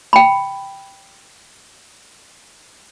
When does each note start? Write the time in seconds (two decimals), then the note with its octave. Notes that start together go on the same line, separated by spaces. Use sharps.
0.13 G5 B5